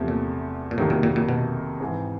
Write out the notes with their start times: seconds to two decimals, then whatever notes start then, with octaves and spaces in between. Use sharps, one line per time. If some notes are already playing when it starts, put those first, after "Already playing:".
Already playing: E2 C3 F3 A3
0.08 A#2
0.71 A#2
0.77 F2 A2 C3 D#3 F#3 A#3
0.90 A#2
1.03 A#2
1.16 A#2
1.29 B2
1.80 G#2 E3 G#3 C4